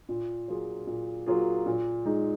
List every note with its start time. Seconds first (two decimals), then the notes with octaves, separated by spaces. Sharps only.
0.09 A#2
0.48 F#3 A#3 F4 G#4
0.87 A#2
1.26 F#3 A#3 F4 G#4
1.66 A#2
2.05 G#3 D#4 G#4